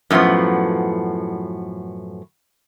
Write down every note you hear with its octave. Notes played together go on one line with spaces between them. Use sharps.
F#2 A2 D3 F3 B3